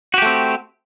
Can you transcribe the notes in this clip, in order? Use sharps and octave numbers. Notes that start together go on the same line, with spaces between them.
A3 C4 F#4 G4